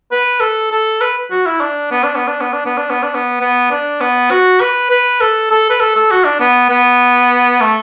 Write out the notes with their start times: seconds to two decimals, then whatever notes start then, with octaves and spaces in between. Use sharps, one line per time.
0.11 B4
0.40 A4
0.72 A4
1.01 B4
1.31 F#4
1.46 E4
1.61 D4
1.91 B3
2.03 D4
2.15 B3
2.27 D4
2.41 B3
2.53 D4
2.66 B3
2.77 D4
2.90 B3
3.03 D4
3.14 B3
3.41 B3
3.71 D4
4.01 B3
4.30 F#4
4.61 B4
4.91 B4
5.21 A4
5.51 A4
5.70 B4
5.80 A4
5.96 A4
6.11 F#4
6.25 D4
6.40 B3
6.70 B3
7.61 A3